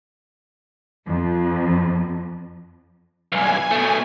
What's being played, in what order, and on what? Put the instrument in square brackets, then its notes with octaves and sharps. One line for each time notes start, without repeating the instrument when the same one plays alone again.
[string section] F2
[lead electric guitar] B1 G2 [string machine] G#5
[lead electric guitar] B2 A3